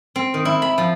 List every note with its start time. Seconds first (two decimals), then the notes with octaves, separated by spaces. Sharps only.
0.16 C4
0.34 D#3
0.45 E4
0.62 B5
0.78 F3